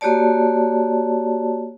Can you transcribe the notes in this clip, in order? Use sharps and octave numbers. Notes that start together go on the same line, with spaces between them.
A#3 F#4 G4 C#5 D5 A5